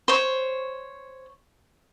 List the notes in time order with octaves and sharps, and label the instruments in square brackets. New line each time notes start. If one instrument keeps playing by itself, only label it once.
[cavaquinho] C5 C#5